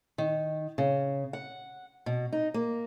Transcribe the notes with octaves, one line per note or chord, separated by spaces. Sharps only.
D#3
C#3
F#5
B2
D#4
A#3